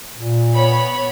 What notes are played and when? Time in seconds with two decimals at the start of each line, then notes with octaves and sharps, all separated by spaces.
0.12 A#2
0.53 B3 C#5 B5